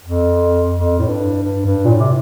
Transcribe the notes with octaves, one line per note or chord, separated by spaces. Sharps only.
F2
F2
A2
G2
G2
G2
A#2
A2
C3